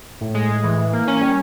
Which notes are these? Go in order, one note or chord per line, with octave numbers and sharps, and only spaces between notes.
A2
G#3
A2
E3
E3
A#3
C#4
G3